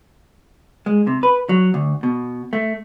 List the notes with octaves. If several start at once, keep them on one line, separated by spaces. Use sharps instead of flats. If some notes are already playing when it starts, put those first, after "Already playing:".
G#3
C3
B4
F#3
D2
B2
A3